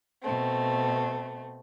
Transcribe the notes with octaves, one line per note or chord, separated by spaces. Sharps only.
B2 A3 C4